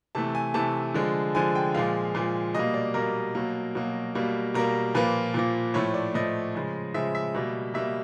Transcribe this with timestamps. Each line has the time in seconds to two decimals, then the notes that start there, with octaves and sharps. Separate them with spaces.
0.15 C3 E3 A3 A5
0.35 G#5
0.54 C3 E3 A3 A5
0.94 D3 F3 G#3
1.35 D3 F3 G#3 G#5
1.55 G5
1.74 A#2 F3 G#3 F5
2.15 A#2 F3 G#3
2.54 B2 G3 A#3 D#5
2.74 D5
2.94 B2 G3 A#3 A#4
3.35 B2 F#3 A#3
3.75 B2 F#3 A#3
4.15 B2 G3 A#3
4.54 B2 G3 A#3 A#4
4.95 A#2 F3 A#3 B4
5.34 A#2 F3 A#3
5.74 A2 F3 A3 C#5
5.94 D5
6.14 A2 F3 A3 D#5
6.55 C#3 F3 G#3
6.94 C#3 F3 G#3 E5
7.15 E5
7.35 B2 G3 A#3
7.74 B2 G3 A#3 E5